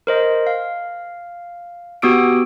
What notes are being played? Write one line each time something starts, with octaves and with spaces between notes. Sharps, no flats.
A#4 C5 D#5
F5
B3 F#4 G4 D#6 E6 D7